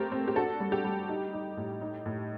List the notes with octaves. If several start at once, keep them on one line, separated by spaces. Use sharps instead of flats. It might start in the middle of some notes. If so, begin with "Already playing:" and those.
Already playing: A3 C4 G4 A#4
C4
G4
D4 F#4 A4
G3
G4
G3
D#4
D#4
A2
D#4
A2